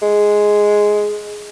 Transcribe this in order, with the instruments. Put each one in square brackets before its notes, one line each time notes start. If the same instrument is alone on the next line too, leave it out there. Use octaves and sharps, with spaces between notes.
[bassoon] G#3